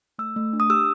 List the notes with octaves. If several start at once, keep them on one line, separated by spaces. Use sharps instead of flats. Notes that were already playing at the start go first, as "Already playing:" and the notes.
A3 E6
A3
D4
D#6
G4 E6